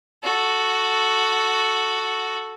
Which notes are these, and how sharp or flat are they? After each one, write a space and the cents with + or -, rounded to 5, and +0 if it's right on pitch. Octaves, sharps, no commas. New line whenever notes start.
F#4 +0 A4 +0